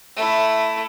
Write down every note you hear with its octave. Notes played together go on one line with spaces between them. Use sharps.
A3 E4